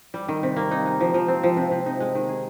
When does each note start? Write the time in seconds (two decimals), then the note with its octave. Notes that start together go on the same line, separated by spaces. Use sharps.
0.14 G3
0.28 D#3
0.43 C3
0.56 A#3
0.71 D#4
0.86 G#3
1.00 F3
1.14 F3
1.28 C4
1.43 F3
1.57 C3
1.71 C3
1.86 D#4
2.00 G#3
2.15 D#3
2.29 G#4